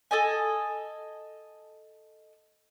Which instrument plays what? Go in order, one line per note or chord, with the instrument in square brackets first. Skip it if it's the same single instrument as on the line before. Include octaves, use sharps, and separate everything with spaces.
[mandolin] A4 D#5 G#5